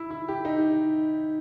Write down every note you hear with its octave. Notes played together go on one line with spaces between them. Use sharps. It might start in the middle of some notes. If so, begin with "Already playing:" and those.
Already playing: E4
E4
G4
D#4